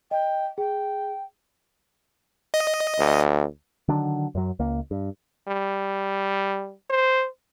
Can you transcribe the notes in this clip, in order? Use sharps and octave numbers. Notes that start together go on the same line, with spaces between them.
D#5 G5
G#4 G5
D#5
D2
D3 D#3 F#3 D4
F#2 F#3
C#2 A#3
G2
G3
C5